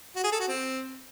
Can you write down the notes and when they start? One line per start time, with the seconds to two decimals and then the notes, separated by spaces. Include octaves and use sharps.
0.16 F#4
0.24 G#4
0.32 A4
0.40 F#4
0.48 C4